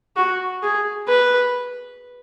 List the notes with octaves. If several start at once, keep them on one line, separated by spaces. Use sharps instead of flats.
F#4
G#4
B4